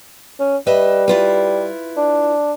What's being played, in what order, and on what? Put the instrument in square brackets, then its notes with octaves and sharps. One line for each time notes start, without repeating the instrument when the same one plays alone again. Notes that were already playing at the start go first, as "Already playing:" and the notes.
[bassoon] C#4
[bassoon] G3 [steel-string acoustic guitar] B4 D#5 E5
[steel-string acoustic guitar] E4 F4 B4
[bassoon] D4